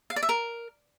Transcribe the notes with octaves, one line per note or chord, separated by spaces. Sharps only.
F5
D5
E5
A#4